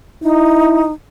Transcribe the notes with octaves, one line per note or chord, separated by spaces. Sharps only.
D#4 E4